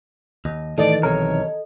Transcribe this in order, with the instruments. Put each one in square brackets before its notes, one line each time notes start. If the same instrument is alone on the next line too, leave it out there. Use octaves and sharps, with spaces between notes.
[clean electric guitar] D#2 [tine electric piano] D#5
[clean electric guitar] A2 [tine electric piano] D#3 E3 [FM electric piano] A4 D#5 [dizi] D5
[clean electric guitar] B1 C3 A#4 [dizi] C#5